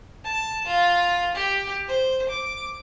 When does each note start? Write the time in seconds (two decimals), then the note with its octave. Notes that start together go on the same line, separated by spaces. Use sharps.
0.24 A5
0.67 F4
1.35 G4
1.88 C5
2.29 D6